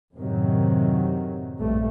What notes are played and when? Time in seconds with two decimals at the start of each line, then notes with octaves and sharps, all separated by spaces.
0.15 F#2 A2 C3 D#3 F#3
1.58 A#1 G2 G3 A3